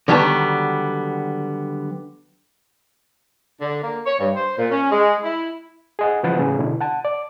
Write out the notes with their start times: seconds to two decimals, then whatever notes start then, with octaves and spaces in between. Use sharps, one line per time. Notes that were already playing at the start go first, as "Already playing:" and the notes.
0.08 D3 D#3 F#3 G3 B3 A5
3.61 D3
3.82 A#3
4.06 C#5
4.19 G2
4.35 C5
4.58 A#2
4.70 C#4
4.91 G#3
5.23 E4
5.99 G#4 D#5 F#5
6.23 C#3 E3 F3 B4 F#5 A6
6.36 A2 C#3 F#3 B3
6.59 B2 D3 E4
6.81 F#5 A5
7.05 D5